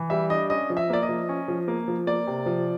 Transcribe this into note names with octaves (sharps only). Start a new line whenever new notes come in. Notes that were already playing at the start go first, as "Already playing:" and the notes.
Already playing: E3
G3 E5
D4 D#5
C#4 D#5
F3
E5
A#3 D5
D#5
F3
C#4
F3
A#3
F3
A#3 D5
C3
F3